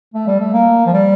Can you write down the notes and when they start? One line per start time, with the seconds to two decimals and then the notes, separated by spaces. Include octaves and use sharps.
0.14 A3
0.27 G3
0.40 A3
0.53 A#3
0.86 F3
0.93 G3